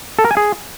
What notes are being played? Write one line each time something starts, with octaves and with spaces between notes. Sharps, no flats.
A4
A#4
G#5
G#4